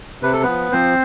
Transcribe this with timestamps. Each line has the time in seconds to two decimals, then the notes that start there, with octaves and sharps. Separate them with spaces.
0.23 C3 B4
0.33 A4
0.43 F3 B3 B4
0.72 F3 C4 C5